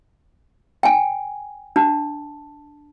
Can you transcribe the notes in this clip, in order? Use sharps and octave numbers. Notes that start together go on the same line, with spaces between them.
G5 G#5
D4 A5